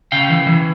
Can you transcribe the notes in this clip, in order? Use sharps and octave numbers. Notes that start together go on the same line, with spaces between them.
C#3 F5 G5
E3
E3